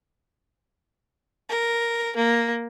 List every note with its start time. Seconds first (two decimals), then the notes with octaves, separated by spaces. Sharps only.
1.49 A#4
2.16 A#3